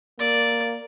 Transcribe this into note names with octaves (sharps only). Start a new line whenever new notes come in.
A#3 D5